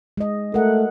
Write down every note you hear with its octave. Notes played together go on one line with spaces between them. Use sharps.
G#3 D#5
A3 A#4 F#5